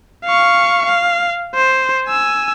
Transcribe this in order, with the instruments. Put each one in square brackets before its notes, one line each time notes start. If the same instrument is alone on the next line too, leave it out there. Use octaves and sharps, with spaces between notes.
[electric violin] F5 C#6
F5
C5
G#5 E6